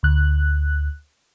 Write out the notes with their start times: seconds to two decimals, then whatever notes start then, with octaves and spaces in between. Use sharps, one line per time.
0.03 D2 F#6